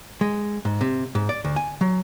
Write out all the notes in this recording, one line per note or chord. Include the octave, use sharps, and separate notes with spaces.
G#3
G#2
C3
G#2
D5
D2
G#5
F#3